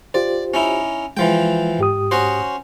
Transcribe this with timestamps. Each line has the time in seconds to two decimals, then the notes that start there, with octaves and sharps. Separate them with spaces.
0.14 F4 G4 C5 D5
0.54 C#4 D#4 E4
1.17 E3 F3 G#3 G5
1.79 G#2 G4 D#6
2.11 C#4 F#4 C5